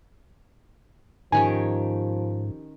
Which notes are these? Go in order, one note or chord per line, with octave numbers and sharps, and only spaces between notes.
G#2 D#3 F3 C#4 G4 G#5